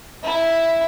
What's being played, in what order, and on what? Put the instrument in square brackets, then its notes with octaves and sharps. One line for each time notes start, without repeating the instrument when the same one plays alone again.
[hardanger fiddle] E4